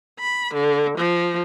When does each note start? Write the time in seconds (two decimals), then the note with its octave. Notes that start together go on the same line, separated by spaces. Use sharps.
0.20 B5
0.54 D3
0.98 F3